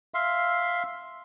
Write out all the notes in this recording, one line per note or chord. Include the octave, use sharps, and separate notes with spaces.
E5 F5 C6